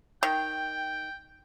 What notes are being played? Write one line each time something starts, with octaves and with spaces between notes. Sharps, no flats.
D#3 G5